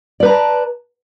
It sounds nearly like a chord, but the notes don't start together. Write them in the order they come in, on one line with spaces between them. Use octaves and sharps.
D5 B4 A#5 A5